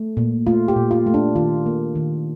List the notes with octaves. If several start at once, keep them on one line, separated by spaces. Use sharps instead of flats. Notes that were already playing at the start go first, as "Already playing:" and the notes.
Already playing: A3
A#2
A3 F4
G4
A#2
F4
A3
D4
D#3 F4
A#3
D#3